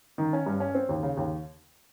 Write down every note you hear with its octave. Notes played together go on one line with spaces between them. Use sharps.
D#3
C#4
G2
C#4
C4
D#2
C#3
D#2